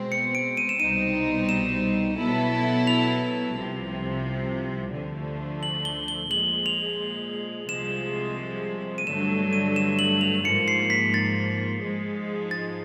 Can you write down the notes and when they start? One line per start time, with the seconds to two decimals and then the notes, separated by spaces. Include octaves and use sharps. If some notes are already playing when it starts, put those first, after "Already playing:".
Already playing: B2 G#3 C4
0.12 C#7
0.35 D7
0.57 D#7
0.69 E7
0.80 C2 B2 G3 C4 D#4 D#7
1.49 E7
2.19 B2 F#3 B3 E4 A4
2.87 F7
3.56 C2 C3 F3
4.94 D2 D3 F3 A3
5.63 F#7
5.85 G7
6.08 G7
6.31 A#2 F3 G#3 F#7
6.66 F7
7.69 C2 C3 F3 G#3 E7
8.98 D#7
9.07 G2 D3 F#3 A3 E7
9.53 D#7
9.76 E7
9.99 F#7
10.21 F7
10.44 G#2 F3 A#3 C#7
10.68 C7
10.90 B6
11.14 A6
11.82 G#2 F3 G#3
12.51 A6